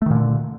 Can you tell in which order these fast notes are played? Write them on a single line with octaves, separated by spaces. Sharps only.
A3 D#3 A#2 D3